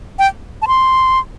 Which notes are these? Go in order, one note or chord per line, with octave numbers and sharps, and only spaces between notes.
G5
A5
C6